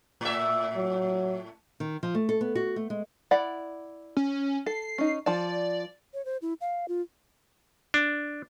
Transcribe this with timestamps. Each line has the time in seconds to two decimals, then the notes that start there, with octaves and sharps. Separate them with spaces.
0.21 A2 E5
0.76 F#3
1.80 D#3
2.03 F3
2.15 A3
2.29 A4
2.41 B3
2.55 F#4
2.76 A3
2.90 G#3
3.31 E4 D5 F#5
4.17 C#4
4.66 A4 C7
4.98 C#4 D#4
5.26 F3 D5 A5
6.14 C#5
6.25 C5
6.42 E4
6.61 F5
6.88 F4
7.94 D4